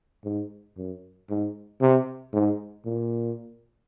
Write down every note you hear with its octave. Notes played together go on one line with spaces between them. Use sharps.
G#2
F#2
G#2
C3
G#2
A#2